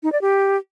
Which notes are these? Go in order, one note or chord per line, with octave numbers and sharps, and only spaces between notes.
D#4
D5
G4